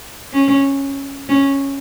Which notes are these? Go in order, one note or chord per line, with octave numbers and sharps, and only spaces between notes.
C#4
C#4